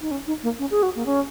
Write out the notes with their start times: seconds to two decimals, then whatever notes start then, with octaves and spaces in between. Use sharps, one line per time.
0.01 D#4
0.11 C#4
0.27 D#4
0.43 A#3
0.59 C#4
0.70 G#4
0.83 F#4
0.95 A#3
1.06 C#4